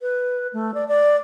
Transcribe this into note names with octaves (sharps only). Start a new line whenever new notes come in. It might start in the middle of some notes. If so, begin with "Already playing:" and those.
B4
A3
D5
D5